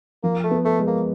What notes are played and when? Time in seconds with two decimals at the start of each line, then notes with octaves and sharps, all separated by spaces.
0.23 F3 A#3
0.44 A3
0.51 B3
0.65 A3
0.79 G#3
0.87 A#3